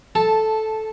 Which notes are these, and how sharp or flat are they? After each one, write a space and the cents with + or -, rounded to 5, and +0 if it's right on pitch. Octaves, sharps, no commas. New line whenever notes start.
A4 -10 A5 +0